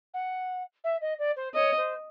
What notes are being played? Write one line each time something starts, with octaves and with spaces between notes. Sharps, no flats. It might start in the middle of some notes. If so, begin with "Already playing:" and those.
F#5
E5
D#5
D5
C5
C#5 D#5
C5